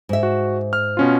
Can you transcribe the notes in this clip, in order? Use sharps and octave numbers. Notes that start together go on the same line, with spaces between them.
G#2 E5
F#4
F6
B2 C#4 F4